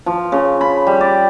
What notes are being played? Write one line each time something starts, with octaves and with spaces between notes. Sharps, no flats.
F3
C#3
B5
G3
D5